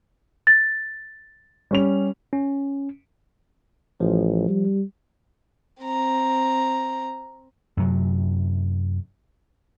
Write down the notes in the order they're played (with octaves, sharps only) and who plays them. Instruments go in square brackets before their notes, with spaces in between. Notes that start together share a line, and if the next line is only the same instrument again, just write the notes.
[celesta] A6
[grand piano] G3 C#4 F7
[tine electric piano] C#4
[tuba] A1 [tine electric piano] F3
[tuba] G3
[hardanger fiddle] C4 A#5
[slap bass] F#2 C3 F#3